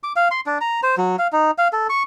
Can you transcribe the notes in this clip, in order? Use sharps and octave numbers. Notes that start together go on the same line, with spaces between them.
D6
F5
C6
D4
A#5
C5
F#3
F5
D#4
F5
A4
C#6